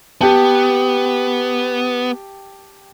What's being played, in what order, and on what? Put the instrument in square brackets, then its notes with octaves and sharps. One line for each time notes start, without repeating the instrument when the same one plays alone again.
[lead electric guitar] B3 [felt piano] G4 G5 A5